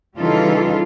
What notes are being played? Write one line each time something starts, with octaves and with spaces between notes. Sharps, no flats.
C#3 E3 G3 D#4 F4 A4